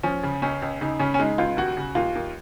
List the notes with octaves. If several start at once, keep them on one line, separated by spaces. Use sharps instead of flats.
F3 C#4
C#3
C#2 C#4
C#2
C#3 D#4
C#3 C#4
C#4
G#3 D#4
C#2 F4
D#2 F#4
C#3
D#2 F4
D#2